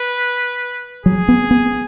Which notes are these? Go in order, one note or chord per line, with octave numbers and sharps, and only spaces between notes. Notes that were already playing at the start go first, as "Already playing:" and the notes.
Already playing: B4
F#3 G#4
B3
B3